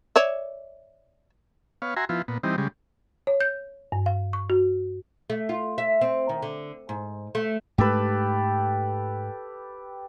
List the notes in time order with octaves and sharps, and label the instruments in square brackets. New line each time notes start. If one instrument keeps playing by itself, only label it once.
[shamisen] C#5 D5 E5
[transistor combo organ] B3 C#5 F5
F#4 E5 G#5 A#5 C6
F3 B3 E4 F4
A#2 B3
E3 G3 C4 D#4
C#3 G3 G#3
[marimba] C#5
G6
G2
F5
C#6
F#4
[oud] A3
F4
E5
C4
D#3
D3
G#2
A3
[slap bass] G#2 A3 [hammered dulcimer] G4 A4 B4